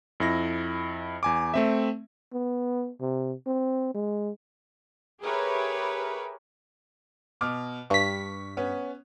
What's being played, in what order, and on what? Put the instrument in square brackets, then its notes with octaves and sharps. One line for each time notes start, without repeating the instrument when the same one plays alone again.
[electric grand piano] F2 E4 A#6
E2 G#5 D6
A3 C4 E5
[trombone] B3
C3
C4
G#3
[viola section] G4 G#4 A#4 B4 C#5 E5
[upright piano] B2 D6 F6
[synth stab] G2 B6 [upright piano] C#6
[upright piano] B3 C#4